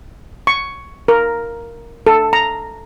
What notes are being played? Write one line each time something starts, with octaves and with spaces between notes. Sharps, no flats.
C#6
A#4
A4
A#5